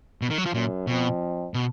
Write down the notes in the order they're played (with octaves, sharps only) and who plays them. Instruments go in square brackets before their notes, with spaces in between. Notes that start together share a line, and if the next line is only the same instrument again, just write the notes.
[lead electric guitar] B2
D#3
F#3
F3
[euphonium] F#2 [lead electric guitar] A#2
[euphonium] F2 [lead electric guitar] B2
[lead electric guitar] B2